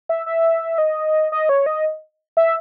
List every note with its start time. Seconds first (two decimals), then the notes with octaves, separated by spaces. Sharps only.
0.09 E5
0.26 E5
0.78 D#5
1.32 D#5
1.49 C#5
1.66 D#5
2.37 E5